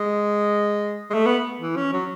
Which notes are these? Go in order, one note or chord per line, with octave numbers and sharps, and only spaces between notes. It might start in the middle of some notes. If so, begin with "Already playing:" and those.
Already playing: G#3
G#3
A3
B3
E3
C#4
F#3